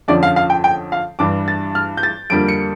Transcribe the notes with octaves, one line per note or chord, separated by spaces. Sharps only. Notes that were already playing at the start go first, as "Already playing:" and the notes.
F2 D3 F3 C#4 D5
F5
F5
G5
G5
F5
G2 E3 G3 D4 D6
A6
F6
G6
A6
F2 D3 G3 A#3 D7
C#7